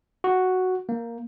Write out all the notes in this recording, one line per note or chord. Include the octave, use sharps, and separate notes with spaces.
F#4
A#3